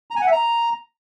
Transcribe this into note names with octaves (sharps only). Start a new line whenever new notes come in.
A#5
G#5
F#5
E5
A#5